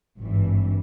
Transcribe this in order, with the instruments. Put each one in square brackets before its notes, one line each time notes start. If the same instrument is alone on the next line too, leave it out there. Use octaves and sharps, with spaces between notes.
[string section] G#1 G2 E3